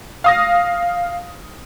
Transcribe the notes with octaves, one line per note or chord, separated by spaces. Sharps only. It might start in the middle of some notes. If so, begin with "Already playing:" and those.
F5 D#6 A#6